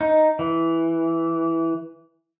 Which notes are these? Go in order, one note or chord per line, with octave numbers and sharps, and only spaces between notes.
D#4
E3